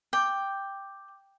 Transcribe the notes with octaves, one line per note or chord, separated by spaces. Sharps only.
G5 D6 G6